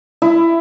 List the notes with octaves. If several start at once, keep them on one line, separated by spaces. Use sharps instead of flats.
E4